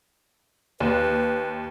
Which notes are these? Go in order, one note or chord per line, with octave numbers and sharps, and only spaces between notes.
D#2 B4